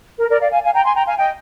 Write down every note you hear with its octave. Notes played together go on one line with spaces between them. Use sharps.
A#4
A#4 D5
D5 F5
F5 G#5
F5 G#5
G5 A#5
G#5 C6
G5 A#5
F5 G#5
D#5 G5